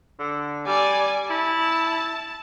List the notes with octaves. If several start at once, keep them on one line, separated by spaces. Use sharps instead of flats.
D3
G3 D5 G#5
E4 A5